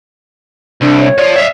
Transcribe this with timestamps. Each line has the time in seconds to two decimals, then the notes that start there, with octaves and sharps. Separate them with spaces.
0.82 C2 D4
0.98 C#5
1.18 F3 D5
1.36 E5 F5